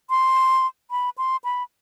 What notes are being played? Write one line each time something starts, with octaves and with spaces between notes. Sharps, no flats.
C6
B5
C6
B5